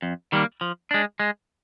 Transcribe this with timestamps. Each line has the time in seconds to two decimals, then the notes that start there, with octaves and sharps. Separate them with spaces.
0.02 F2
0.32 D#3 G3 A#3
0.61 F3
0.91 G#3 D4
1.20 G#3